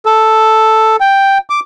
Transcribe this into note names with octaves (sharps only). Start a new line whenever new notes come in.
A4
G5
D6